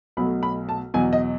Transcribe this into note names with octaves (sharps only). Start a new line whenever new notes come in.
B1 B2 F#3 A3 B5
B5
A5
E2 B2 F#3 G#5
D#5